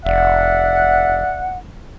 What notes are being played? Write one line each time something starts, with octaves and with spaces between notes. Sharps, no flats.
F1 D5 E5 F#5